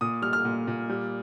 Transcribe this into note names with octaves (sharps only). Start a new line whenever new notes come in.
A#2 D#6
G3 F6
F6
A#2
A#2
G3